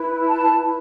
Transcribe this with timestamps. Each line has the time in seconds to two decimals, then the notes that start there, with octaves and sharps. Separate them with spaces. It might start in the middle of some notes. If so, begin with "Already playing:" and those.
Already playing: E4 B4
0.27 A5